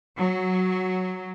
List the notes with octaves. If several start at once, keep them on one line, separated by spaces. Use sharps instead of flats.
F#3